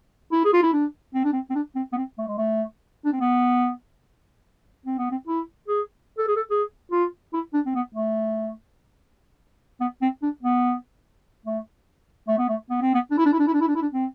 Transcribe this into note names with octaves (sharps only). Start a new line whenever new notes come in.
E4
G#4
F4
E4
D4
C4
D4
C4
C4
D4
C4
B3
C4
A3
G#3
A3
D4
C4
B3
C4
B3
C4
E4
G#4
A4
G#4
A4
G#4
F4
E4
D4
C4
B3
A3
B3
C4
D4
B3
A3
A3
B3
A3
B3
C4
B3
D4
E4
D4
E4
D4
E4
D4
E4
D4
E4
D4
C4